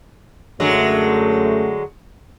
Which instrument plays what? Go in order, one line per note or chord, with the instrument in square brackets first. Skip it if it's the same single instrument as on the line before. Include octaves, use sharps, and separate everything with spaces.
[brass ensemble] F#2 A3 [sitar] D3 F#3 G#3